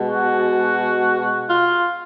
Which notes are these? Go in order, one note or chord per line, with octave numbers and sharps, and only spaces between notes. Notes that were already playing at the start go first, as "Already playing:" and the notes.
Already playing: B2 G#3
F#4
F4